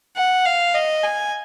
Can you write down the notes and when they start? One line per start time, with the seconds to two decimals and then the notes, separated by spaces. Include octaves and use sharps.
0.17 F#5
0.45 F5
0.75 D#5
1.04 G#5